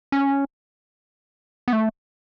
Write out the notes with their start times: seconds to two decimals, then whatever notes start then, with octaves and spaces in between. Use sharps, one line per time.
0.12 C#4
1.68 B3
1.73 A3